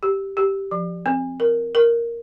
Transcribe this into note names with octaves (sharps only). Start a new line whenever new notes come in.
G4
G4
F3
C4
A#4
A#4